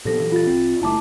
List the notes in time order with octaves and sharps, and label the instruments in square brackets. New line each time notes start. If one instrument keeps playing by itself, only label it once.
[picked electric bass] A#2 F3 B3 [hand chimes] G4 A4 A#6
[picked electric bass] A#2 E3 F#3
[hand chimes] F4 A6
[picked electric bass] C2 C4
[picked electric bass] F#1 G3 A3 [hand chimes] E4 A5 D6